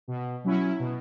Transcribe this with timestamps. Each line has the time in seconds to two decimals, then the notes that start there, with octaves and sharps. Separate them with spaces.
0.08 B2
0.44 F#3 C#4 E4
0.79 B2